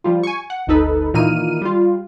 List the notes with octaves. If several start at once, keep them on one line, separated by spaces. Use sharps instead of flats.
F3 G3 F4
G#5 C#6
F#5
G1 D2 D#4 A4 B4
A#2 D#3 E3 A#3 F6 D#7
G3 F4